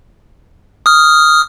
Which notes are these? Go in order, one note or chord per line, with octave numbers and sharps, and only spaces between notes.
D#6 F6